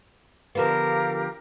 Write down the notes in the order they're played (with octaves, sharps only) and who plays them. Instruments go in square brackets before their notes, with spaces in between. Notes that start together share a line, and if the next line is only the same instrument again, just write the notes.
[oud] D3 F3 B3 [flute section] G4 A#4 F5